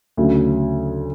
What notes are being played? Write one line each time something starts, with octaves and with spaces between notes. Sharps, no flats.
D2 C#3 F#3